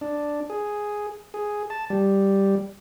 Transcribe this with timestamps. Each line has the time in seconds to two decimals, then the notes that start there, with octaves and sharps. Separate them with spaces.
0.01 D4
0.50 G#4
1.34 G#4
1.70 A5
1.90 G3